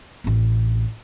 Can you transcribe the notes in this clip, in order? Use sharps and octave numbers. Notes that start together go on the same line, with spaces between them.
A1 C4